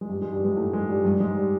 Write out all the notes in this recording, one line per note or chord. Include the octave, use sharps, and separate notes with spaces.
G#3
G2 G3
G#2 G#3
G2 G3
G#2 G#3
A2 A3
G#2 G#3
G2 G3
G2 G3
G#2 G#3
G3